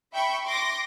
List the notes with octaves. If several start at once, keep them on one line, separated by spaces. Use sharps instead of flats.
E5 G5 B5 C#6
C6 D6 A#6